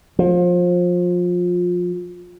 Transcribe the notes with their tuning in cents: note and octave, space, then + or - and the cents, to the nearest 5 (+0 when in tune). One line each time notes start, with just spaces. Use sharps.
F3 +25